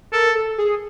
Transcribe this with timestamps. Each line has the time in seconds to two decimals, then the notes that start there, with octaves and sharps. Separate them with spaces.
0.12 A4 A#4
0.35 A4
0.58 G#4